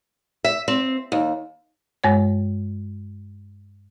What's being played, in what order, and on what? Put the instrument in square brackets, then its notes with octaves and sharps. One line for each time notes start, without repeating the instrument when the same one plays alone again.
[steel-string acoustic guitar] E5
C4
D#2
[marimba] G2 G#3 C#5